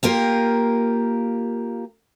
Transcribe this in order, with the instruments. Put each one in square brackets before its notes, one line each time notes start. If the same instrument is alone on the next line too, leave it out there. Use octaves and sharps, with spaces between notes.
[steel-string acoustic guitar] A#3 F4 G4 A#4